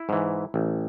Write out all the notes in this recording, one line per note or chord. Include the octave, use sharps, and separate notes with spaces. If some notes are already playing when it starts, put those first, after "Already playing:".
Already playing: E4
G#2 E3
A1